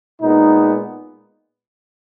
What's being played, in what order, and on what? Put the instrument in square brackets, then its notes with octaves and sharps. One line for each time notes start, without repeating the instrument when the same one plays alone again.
[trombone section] A#2 G#3 B3 D#4